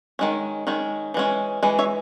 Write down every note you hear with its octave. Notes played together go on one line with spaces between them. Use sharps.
D#3 G#3 C#4
D#3 G#3 C#4
E3 G#3 C#4
E3 G#3
C#5 E5